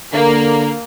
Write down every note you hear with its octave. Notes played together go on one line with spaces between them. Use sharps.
D3 A#3